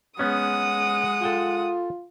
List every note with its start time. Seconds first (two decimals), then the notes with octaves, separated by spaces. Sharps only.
0.19 G#3 B3 C#4 F#5 D#6
1.22 F4 A4 G5 G#5